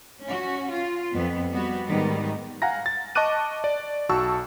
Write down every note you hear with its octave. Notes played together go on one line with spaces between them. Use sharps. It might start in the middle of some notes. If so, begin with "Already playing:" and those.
C#4 F#4
F4
F2 B3
G3 B3 F#4
G#2 D#3 G3 B3
F5 F#5 G#5 A#5 A#6
A6
D#5 A5 C#6 D6 F#6 D#7
D5
B1 F#4 A5 C#6 E6